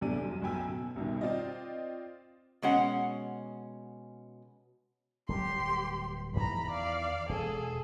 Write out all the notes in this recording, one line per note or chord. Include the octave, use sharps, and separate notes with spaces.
B1 E2 C3 A3 D4 D#7
F#2
B1 F#2 B3 G5 G#5 E6
B2
C2 B2 D#3
C4 F4 D5 D#5
B2 G#3 C#4 F#5
D1 F#3 G3 G4 C6
E2 D#3 E3 A#5 B5
D5 F5
E1 G#4 A4